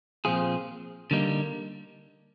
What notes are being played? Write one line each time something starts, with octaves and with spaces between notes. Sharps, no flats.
A#2 F3 C4 F4 G#4
D3 G3 A#3 D#4